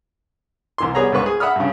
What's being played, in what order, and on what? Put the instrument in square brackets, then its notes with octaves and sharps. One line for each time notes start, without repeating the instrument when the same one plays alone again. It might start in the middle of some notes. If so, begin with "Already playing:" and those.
[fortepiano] C2 E3 C6
G3 B3 G#4 C#5 A#5
C#2 G#2 B4 C#6
G#4
E5 F#5 B5 D#6 F6
G2 C#3